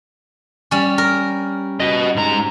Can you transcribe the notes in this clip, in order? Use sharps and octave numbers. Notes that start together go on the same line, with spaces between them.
G3 C#4
A#4
F#4 D#5
G#2 A#5